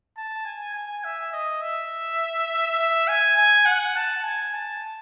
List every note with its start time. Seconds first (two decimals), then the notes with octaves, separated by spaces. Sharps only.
0.17 A5
0.45 G#5
0.75 G#5
1.04 E5
1.33 D#5
1.61 E5
2.79 E5
3.08 G#5
3.37 G#5
3.66 F#5
3.96 A5
4.24 G#5
4.54 A5